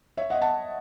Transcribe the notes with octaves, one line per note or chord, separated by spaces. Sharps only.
C#5 E5
D#5 F#5
F#5 A5